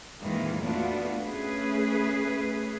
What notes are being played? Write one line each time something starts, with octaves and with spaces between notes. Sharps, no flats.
F2 A#2 D#3 E3 G#3 A#3
A3 B3 D4 F4 F#4
A3 C#4 G#4 B4